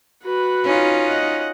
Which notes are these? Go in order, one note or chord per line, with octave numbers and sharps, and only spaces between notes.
F#4 B4
C#4 D#4 F4
D#5 F#5